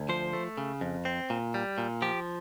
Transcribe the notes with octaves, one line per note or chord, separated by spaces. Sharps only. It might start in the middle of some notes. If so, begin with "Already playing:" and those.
Already playing: D2
F3 C5
A3
C#3
F2
C4
A#2
G3
A#2
F3 G4